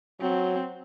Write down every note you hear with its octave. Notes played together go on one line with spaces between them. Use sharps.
F#3 C4